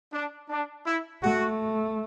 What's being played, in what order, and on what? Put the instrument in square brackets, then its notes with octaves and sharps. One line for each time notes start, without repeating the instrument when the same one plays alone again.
[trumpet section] D4
D4
E4
[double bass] A3 [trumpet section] F#4